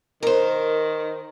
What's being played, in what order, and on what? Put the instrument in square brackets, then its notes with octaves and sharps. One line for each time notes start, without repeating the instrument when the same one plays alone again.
[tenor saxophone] D#3 [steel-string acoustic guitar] A#4 C5